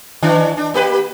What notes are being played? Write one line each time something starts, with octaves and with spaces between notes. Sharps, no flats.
D#3 E3 D4
D4
A#3 G4 B4